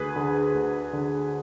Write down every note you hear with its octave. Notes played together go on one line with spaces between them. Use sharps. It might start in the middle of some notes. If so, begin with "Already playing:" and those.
Already playing: D2 G#4 B4
D3
D2
D3